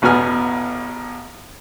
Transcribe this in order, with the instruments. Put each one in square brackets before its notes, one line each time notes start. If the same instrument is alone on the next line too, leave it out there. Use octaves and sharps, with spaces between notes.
[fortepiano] A1 E2 B2 B3 G#5 F6